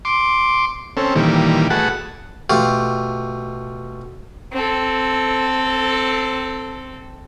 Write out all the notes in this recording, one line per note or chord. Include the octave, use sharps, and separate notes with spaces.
C6 D6
C4 C#4 A4
A#2 D#3 E3 G3
A3 F#4 G#4 B4 F#5 A5
B2 A3 F4 G4
C4 A4